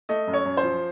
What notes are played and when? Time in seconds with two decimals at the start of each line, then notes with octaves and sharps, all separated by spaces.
0.09 A3 D#5
0.27 F#2
0.33 C#5
0.45 F#2
0.57 C5
0.63 F3